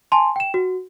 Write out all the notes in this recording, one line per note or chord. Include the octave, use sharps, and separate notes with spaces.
G#5 A5 C6
G5 E7
F#4